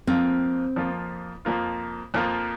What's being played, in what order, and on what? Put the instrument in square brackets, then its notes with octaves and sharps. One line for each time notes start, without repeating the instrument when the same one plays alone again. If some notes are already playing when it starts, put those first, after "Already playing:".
[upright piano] F2 F3 A#3 F4 [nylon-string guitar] C4
[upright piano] F2 F3 A#3 F4
F2 F3 A#3 F4
F2 F3 A#3 F4